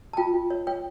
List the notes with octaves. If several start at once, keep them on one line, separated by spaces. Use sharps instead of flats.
A5
F4 G5
F4
C#5
C#5 G5